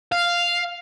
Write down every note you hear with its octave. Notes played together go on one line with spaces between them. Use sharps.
F5